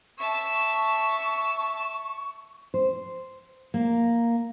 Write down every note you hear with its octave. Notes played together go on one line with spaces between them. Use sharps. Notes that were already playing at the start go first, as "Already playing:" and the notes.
E5 A5 C#6
C5
A#3